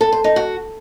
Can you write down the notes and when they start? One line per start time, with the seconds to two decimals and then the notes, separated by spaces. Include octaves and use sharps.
0.01 A4
0.12 C5
0.24 D#4
0.36 F#4